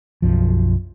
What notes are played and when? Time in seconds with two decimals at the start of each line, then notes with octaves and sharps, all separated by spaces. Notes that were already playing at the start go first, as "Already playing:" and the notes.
0.22 B1 F#2 F3